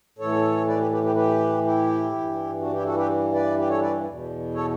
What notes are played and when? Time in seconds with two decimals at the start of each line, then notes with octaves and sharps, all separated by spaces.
0.18 A2 E3 A4 C#5
0.67 B4 D5
0.79 G4 B4
0.91 G4 B4
1.03 G4 B4
1.15 G4 B4
1.64 E4 G4
2.12 G2 E3
2.61 D4 F#4
2.73 E4 G4
2.84 F#4 A4
2.97 G4 B4
3.33 B4 D5
3.57 G4 B4
3.69 A4 C#5
3.81 B4 D5
4.05 E2 B2
4.54 A4 C#5